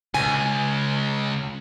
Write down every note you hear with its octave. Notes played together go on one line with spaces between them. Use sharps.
C#2 G#5